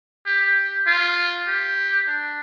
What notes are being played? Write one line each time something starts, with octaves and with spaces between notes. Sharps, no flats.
G4
F4
G4
D4